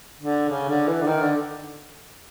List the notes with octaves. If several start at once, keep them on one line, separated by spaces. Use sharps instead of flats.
D3
C#3
D3
E3
D3
D#3
D3